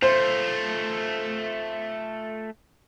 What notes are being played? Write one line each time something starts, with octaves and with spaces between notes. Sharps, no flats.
A3 F4 C5